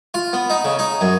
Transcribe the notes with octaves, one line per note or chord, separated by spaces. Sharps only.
F4
B3
D#4
C#3
D#4
F#2